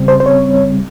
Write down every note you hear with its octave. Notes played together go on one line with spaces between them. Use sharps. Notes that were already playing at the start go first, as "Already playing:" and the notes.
Already playing: C#3 G3 C4
C5
C5
C#5